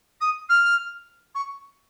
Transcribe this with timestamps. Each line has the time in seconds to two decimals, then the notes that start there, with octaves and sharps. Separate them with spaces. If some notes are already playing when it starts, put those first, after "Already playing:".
0.20 D#6
0.49 F6
1.35 C#6